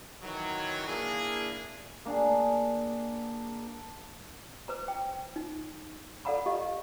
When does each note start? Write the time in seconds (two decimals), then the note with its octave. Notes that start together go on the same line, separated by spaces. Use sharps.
0.22 D#3 E3 F#3
0.88 A#3 D4 E4 G#4
2.05 A#3 D4 F#4 G#4
4.68 B4 C5 A#5
4.88 G5
5.36 D#4
6.25 A4 D5 F5 F#5 A#5 B5
6.46 G4 D#5 F5